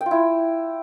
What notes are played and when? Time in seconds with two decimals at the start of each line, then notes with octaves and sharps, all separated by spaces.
0.01 G5
0.06 F4
0.11 E4